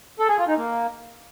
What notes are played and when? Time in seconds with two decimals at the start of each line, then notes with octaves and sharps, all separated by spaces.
0.19 A4
0.29 G#4
0.38 F4
0.48 D#4
0.57 A#3